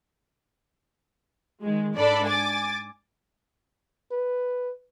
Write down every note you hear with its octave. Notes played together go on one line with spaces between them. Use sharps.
D#3 G#3
G#2 D4 A4 D5 B5
G#5 D6 A6
B4